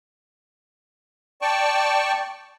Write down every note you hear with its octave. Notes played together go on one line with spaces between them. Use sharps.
D5 G5 A5 C#6